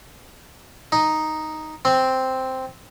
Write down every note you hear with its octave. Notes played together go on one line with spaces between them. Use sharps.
D#4
C4